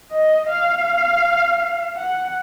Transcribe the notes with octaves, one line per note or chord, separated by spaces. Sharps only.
D#5
F5
F#5